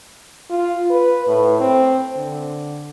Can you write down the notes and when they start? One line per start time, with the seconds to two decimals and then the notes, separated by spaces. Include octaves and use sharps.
0.50 F4
0.90 B4
1.28 A2
1.60 C4
2.16 D3